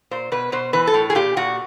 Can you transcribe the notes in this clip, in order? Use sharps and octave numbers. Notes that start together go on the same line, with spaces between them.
A#2 C5
B2 B4
B2 C5
E3 B4
A4
A2
G#4
A#2 G4
A#2 F#4